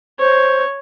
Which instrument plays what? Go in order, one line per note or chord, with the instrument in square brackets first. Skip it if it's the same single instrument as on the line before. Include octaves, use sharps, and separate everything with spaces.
[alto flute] C5 [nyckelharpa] C#5